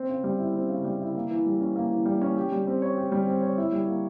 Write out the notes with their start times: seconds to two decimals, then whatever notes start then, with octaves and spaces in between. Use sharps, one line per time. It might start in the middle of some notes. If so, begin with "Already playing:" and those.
Already playing: C4
0.09 C#3
0.24 G3
0.39 E4
0.54 C4
0.69 C#3
0.84 G3
1.01 E4
1.15 A#3
1.31 E3
1.46 G3
1.61 C#4
1.76 A#3
1.91 E3
2.05 G3
2.22 C#4
2.37 G4
2.52 G3
2.67 C4
2.82 C#5
2.98 G4
3.12 G3
3.27 C4
3.42 C#5
3.58 E4
3.72 G3
3.88 A#3